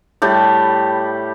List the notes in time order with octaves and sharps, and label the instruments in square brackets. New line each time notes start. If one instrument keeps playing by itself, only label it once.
[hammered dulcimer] A2 G3 G4